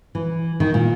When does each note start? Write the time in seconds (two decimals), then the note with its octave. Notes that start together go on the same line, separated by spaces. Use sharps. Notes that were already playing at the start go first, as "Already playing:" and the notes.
0.15 E3
0.60 D#3
0.74 A#2